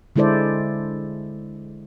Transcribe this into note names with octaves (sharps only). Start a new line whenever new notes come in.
D3 G#3 E4 A4 C5 D5